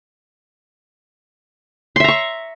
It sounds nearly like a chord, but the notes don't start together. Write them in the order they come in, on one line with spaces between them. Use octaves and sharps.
C6 E5 A#5 C#6